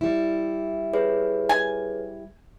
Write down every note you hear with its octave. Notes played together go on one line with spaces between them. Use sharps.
G3 E4
G#4 B4 C#5
G#5